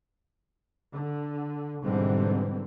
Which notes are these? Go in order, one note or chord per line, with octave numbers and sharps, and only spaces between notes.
D3
G#2 B2 D3 E3 G3 C4